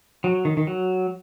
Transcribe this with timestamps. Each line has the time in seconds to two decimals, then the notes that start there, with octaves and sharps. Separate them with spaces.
0.24 F#3
0.45 D#3
0.57 D#3
0.67 F#3